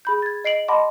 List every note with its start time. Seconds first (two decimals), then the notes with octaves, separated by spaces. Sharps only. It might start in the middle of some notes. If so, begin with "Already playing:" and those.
0.05 G#4 B5 G6
0.22 G#6 A6
0.45 D#5 C7 D7 F#7
0.68 D#5 F#5 A5 B5 C6 D6